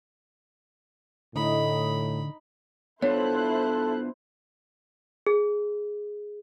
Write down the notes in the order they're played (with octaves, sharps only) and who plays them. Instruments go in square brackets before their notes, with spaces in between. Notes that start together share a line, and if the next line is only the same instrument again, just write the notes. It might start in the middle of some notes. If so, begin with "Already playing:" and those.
[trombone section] A2 [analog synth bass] D3 [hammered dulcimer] D#4 [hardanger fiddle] B5
[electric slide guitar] B3 D4 F4 [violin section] E4 C5 F#6 [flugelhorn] A4 [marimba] C#5
[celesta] G#4